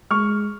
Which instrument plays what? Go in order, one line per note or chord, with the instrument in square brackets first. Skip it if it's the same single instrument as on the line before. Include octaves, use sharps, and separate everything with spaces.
[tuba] G#3 [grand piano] C#6 F6